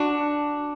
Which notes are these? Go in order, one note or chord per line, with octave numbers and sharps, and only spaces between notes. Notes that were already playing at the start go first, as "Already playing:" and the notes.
Already playing: D4 F#4